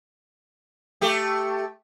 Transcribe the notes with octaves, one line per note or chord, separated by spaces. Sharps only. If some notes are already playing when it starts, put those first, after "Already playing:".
A3 G4